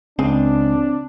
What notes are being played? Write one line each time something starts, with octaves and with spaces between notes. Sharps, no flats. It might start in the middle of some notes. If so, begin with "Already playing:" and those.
C#2 C4 D4 G#4